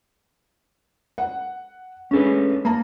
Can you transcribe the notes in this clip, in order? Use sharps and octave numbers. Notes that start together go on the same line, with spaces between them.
F#5
G#3 C#4 D4 A4 B4
A#3 A5 A#5